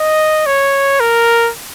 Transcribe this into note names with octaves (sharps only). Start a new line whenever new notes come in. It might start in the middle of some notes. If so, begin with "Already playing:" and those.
Already playing: D#5
C#5
A#4